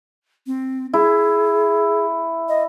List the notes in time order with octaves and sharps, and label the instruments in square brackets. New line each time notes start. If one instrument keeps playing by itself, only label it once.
[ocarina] C4
[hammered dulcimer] E4 [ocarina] G#4
[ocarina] D#5